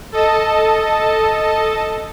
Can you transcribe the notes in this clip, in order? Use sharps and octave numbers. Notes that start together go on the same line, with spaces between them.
A4 D#5 A5